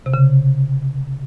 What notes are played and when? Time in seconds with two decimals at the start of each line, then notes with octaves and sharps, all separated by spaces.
0.06 C3
0.14 C#3